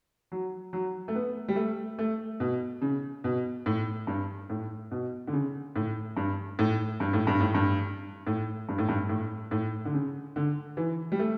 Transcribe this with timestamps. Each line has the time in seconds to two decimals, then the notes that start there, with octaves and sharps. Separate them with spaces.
0.32 F#3
0.73 F#3
1.08 A3
1.15 B3
1.48 G3
1.56 A3
1.99 A3
2.40 B2
2.82 C#3
3.24 B2
3.66 A2
4.07 G2
4.50 A2
4.91 B2
5.27 D3
5.33 C#3
5.76 A2
6.17 G2
6.59 A2
7.00 G2
7.13 A2
7.27 G2
7.40 A2
7.54 G2
8.27 A2
8.69 G2
8.78 A2
8.89 G2
9.09 A2
9.51 A2
9.85 D3
9.94 C#3
10.36 D3
10.77 E3
11.12 G3
11.19 A3